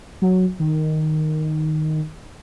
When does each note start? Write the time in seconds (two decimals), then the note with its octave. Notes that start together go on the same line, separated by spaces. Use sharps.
0.22 F#3
0.60 D#3